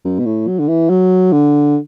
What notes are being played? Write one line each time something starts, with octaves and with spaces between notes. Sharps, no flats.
F#2
B2
A2
F#3
D3
E3
F#3
D3